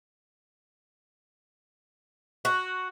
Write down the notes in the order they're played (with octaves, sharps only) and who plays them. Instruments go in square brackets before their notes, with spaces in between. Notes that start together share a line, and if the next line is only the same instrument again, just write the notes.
[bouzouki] F#4